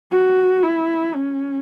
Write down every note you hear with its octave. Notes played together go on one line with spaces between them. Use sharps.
F#4
E4
C#4